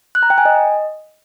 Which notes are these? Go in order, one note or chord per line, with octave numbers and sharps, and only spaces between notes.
F#6
A#5
G5
G#5
D#5